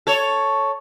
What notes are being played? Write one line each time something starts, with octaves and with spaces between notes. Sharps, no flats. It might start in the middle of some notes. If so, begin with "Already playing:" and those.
A4 C#5